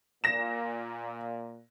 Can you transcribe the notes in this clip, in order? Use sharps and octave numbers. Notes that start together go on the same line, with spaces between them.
A#2 A#6 E7